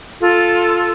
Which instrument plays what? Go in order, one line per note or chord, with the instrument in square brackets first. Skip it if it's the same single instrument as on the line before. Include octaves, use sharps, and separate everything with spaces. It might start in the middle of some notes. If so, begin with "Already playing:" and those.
[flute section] F4 A4